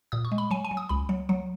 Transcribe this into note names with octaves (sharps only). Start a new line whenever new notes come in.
A#2 D#6
C#6
G#3
B5
F#3 G#5
G#5
F#3
D#6
C#2 B5
F#3
F#3